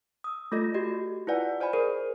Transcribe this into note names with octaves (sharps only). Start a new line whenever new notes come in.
D#6 E6
A3 F4 A4 D#5 A#6
F#4 G4 D#5
E4 F4 B4 D5 F#5 G#5
C5 D5 D#5 G#5 B5
G#4 A#4 C5